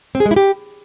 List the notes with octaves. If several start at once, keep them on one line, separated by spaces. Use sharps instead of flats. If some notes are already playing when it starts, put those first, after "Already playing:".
C4
G#4
G#3
E4
G4